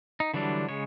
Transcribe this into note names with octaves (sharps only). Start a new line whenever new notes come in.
D#4
D3 E3 F#3 G3 D4
C#3 G#3 C#5